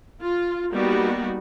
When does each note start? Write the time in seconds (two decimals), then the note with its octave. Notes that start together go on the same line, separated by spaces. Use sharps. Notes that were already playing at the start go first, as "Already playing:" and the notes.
0.21 F4
0.72 G3 A#3 B3 D#4 F#4